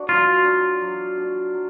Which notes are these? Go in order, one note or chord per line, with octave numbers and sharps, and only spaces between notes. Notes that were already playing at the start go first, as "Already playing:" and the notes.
Already playing: D4 F#4
F#3 F4
D4 F#4
F#3
D4 F#4
F#3